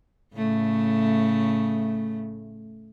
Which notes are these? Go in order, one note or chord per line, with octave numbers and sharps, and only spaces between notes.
A2 C#3 A3